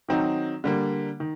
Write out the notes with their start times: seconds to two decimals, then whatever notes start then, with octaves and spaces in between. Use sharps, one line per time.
0.09 D#3 F#3 C4 D#4
0.64 D3 G3 A#3
1.20 D#3